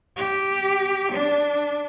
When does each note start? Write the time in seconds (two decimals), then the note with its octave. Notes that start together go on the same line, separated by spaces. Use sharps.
0.16 G4
1.12 D4